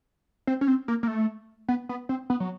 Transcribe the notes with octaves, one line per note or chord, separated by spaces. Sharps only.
C4
C#4
C4
A#3
A#3
A3
B3
B3
C4
B3
F#3